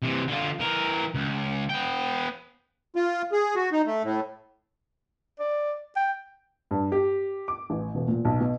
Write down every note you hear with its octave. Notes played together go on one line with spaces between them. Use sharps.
C3 E3
D3 F4
E3 A#4
C#2
B3 G5
F4
G#4
F#4
D#4
A3
A2
D5
G5
G2
G4
D6
A1
E1
A#2
B1
B2